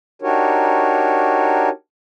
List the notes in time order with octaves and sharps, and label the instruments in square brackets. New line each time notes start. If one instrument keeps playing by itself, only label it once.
[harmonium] D4 D#4 F#4 G4 A#4 C#5